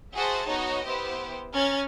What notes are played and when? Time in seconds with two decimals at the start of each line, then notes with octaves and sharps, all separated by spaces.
0.14 F#4 G#4 C5 E5 F#5 A5
0.47 B3 D#4 F#4 C#5 D#5
0.85 B3 E4 G4 C5
1.53 C#4 A#5 F6 G#6 A6